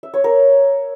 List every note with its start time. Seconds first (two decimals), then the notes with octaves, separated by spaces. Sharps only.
0.03 E5
0.14 C#5
0.24 A#4